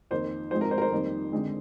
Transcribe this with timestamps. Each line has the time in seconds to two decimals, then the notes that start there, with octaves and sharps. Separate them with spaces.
0.11 F2 D#3 A#3 C5
0.51 G#2 F3 G#3 C4 C5
0.61 A#4
0.71 C5
0.78 A#4
0.82 C5
0.92 F2 D#3 G3 A#3
1.32 D3 G#3 C4